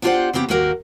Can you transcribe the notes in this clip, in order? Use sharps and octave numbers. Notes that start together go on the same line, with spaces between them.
B3 D4 F4 G4 C5 F#5
C#3 B3 C4 G4
D#2 G#2 A#3 F#4 G4 A#4